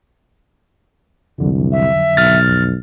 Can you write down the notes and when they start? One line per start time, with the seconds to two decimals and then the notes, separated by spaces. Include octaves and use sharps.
1.39 C2 F2 D3 F#3
1.72 E5
2.17 B1 F6 A6
2.48 F2